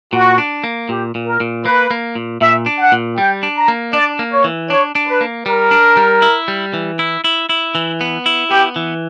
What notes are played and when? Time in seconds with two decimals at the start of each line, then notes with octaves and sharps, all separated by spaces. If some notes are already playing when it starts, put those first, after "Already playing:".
0.13 A#2 F#4
0.38 D4
0.64 A#3
0.89 A#2 G4
1.15 A#2
1.27 A#4
1.40 A#2
1.65 A#3 B4
1.91 A#3
2.15 A#2
2.41 A#2 E5
2.66 D4
2.79 F#5
2.92 A#2
3.17 G3 G5
3.43 D4
3.56 A#5
3.68 A#3
3.93 D4 D5
4.19 A#3
4.32 C#5
4.44 E3
4.70 D4 C#5
4.95 D4
5.08 B4
5.21 A#3
5.46 G3 A#4
5.71 D4
5.97 G3
6.22 E4
6.48 G3
6.74 E3
6.99 E4
7.24 E4
7.49 E4
7.75 E3
8.01 B3
8.26 E4
8.50 B3 G4
8.76 E3